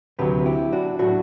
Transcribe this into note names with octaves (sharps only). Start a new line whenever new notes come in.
D2 C3 F#3 G4 B4
E4 G4
D4 F#4
A2 F#3 D4 F#4